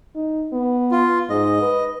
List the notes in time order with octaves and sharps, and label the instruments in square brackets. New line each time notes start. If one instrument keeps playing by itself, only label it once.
[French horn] D#4
B3
[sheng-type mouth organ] F4
[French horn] G#2 [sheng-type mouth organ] D#5
[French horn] B4